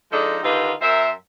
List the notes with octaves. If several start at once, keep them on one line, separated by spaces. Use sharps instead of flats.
F3 G#3 D4 D#4 A4 D#5
D3 D#3 D#4 F4 G4 B4
F#2 A#4 C5 E5